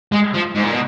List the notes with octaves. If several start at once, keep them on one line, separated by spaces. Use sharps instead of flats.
G#3
F3
G#2
A#2
B2